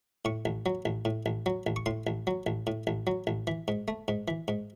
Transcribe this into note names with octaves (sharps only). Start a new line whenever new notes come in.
A2 C#6
A1
F#3
A1
A2
A1
F#3
A1
C#6
A2 C6
A1
F#3
A1
A2
A1
F#3
A1
E3
G#2
A3
G#2
E3
G#2